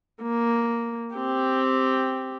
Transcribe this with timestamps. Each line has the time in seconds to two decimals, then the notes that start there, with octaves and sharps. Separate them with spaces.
0.22 A#3
1.15 C4 G4